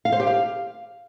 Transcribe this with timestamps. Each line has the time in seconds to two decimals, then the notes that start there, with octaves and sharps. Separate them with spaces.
0.05 F5
0.12 C5
0.20 G4
0.27 F5